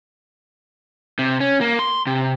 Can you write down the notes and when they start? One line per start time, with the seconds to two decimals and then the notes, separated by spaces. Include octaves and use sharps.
1.19 C3
1.40 C#4
1.61 A#3
1.79 C6
2.07 C3